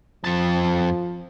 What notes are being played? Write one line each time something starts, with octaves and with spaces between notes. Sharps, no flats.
F2 F3 A5